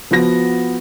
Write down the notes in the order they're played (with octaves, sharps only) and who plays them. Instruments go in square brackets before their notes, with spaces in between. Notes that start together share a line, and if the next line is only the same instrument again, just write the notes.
[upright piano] F3 B3 F#4 A#6